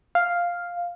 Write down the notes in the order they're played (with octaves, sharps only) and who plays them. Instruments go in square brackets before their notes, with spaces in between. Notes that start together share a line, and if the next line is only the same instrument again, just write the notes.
[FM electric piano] F5